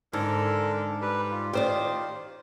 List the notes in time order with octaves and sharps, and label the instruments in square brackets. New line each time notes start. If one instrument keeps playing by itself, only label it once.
[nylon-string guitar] G#2 [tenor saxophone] D3 [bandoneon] A4 A#4
[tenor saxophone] G3 [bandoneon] B4
[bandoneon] F4
[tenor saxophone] D#3 [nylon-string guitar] G4 C5 D5